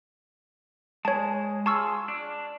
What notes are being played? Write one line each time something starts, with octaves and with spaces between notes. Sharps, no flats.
G#3 C#5 A5
F4 G#4 A5 C#6 E6
D4